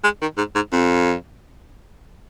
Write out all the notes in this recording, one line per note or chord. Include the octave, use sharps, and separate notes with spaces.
G#3
D#3
G#2
G#2
F2